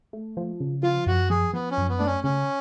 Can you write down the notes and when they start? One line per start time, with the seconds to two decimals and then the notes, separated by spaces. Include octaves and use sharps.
0.13 A3
0.37 F3
0.60 C#3
0.83 F3 F4
1.07 F#2 F#4
1.30 F3 G#4
1.53 F3 B3
1.71 C#4
1.78 F#2
1.89 B3
1.98 A3 D4
2.06 C#4
2.24 C#3 C#4